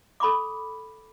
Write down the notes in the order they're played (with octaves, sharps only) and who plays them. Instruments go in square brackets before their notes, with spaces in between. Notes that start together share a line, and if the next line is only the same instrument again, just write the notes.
[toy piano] A4 B5 C#6 D6